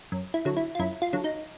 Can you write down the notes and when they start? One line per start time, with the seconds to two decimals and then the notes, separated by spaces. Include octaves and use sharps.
0.12 F#2
0.34 E4
0.45 D3 F#3
0.57 E4
0.75 F4
0.79 F#2 E4
1.02 F4
1.13 D3 F#3
1.24 D#4